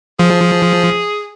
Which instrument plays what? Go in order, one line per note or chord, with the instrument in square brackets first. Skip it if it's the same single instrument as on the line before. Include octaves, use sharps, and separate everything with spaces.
[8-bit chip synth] F3 [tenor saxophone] G#4